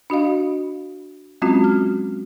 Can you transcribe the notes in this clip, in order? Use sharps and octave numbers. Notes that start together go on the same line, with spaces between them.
D4 F#4 D#5 F5
F#3 G#3 C4 C#4 F4 F#4
F6